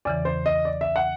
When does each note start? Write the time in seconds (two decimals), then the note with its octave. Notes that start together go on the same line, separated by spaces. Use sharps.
0.05 E2 C#3 E3 D5
0.25 C5
0.46 D#5
0.65 D5
0.81 E5
0.96 F#5